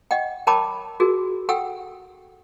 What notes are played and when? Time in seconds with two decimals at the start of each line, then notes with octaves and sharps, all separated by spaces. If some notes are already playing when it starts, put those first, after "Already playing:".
0.11 D#5 F#5 G5
0.47 A#4 C#5 G5 A5 B5 D6
1.00 F#4 G#4 A#4
1.49 A4 F#5 G5 E6